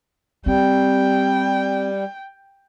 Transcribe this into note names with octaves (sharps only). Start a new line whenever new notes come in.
G3 C4 G5